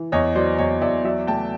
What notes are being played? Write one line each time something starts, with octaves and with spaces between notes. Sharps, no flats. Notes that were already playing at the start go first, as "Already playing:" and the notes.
Already playing: E3
E2 C#5 D#5
F#3 C5 D5
E2 C#5 D#5
E2 D5 E5
F#3 D5 E5
A3 G5 A5